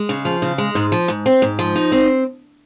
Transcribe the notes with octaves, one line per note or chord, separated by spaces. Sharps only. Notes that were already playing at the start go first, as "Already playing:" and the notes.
Already playing: G#3
C#3
F3
C#3
G#3
G#2
F3
G#2
C4
G#2
F3
D#4
C4